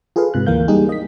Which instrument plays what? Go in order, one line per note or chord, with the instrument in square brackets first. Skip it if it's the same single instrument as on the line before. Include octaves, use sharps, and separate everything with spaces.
[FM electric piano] F4 G#4 A4 B4 F5
G#2 C3 F#6
D2 E3 A#3 A#4 F5 G6
G3 A#3 D#4 G4 G#4
D#5 B6